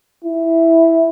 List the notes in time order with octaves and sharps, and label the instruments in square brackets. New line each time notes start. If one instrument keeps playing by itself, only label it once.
[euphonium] E4